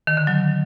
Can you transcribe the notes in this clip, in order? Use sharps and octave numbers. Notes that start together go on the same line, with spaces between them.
D#3
D3
F#3